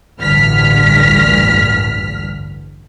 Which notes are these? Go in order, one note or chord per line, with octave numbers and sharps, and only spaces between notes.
A1 D2 G2 F6 B6